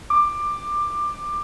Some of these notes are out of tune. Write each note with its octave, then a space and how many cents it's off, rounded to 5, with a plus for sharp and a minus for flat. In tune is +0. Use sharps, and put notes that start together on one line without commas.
D6 +15